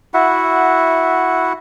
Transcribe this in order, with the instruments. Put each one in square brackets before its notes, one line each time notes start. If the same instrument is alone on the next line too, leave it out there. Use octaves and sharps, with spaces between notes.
[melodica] E4 F#4 E5 F#5